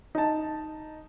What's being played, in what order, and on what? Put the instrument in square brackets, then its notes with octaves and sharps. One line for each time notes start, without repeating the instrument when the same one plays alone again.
[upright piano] D#4 A5